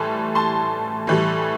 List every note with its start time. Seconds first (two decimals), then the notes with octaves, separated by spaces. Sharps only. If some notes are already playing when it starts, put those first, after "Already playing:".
Already playing: A2 E3 G3 A5 C6
0.35 A5 C6
1.07 A2 E3 G3